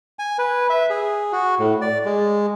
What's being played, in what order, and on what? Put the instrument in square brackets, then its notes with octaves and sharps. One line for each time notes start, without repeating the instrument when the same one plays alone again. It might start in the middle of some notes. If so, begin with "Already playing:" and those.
[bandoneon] G#5
B4
E5
G#4
F#4
A2
D5
G#3